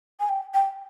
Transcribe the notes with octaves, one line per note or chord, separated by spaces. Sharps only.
G#5
G5
G5